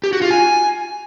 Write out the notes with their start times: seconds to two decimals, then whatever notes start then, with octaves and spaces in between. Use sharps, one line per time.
0.04 G4
0.13 F#4
0.22 F4
0.31 G#5